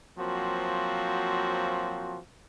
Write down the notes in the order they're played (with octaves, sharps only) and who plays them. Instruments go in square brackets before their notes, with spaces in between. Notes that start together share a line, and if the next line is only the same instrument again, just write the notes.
[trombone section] F3 F#3 A#3 C4 F#4